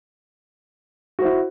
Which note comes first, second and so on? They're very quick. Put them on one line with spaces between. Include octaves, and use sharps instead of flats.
F#4 C5 E4